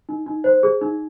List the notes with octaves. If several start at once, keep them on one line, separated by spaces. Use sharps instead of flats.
D#4
D#4
C5
G#4
D#4